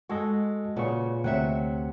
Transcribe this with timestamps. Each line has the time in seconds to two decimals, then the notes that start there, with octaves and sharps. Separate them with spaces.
0.09 G#3 F#4 A4 D#5
0.76 A#2 C#3 F#4 G#4 B4 C#6
1.24 D2 C3 F#3 E5 F#5